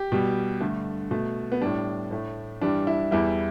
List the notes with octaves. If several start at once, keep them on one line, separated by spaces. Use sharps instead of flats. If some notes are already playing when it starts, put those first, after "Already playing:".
Already playing: G4
B2 G3
G2 D3 A3
B2 A3
B3
A2 G3 D4
A2 A3
G2 E3 G3 D4
E4
E2 E3 G3 E4